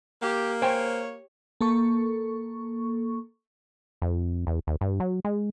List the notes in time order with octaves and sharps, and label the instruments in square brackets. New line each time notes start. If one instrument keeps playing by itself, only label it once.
[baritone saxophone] A#3 [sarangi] G4
[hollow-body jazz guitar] C5 G5 G#5 [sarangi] C#5
[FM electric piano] A#3 A4 C#6
[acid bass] F2
E2
D#2
G2
F#3
G#3